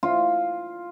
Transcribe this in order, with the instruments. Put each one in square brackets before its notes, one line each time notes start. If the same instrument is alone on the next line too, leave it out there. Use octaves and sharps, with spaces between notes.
[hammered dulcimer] F4